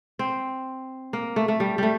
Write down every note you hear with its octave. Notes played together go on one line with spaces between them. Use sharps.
C4
A#3
A3
A3
G3
G3 A3